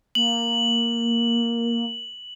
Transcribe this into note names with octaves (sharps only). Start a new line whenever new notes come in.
A#3 F#7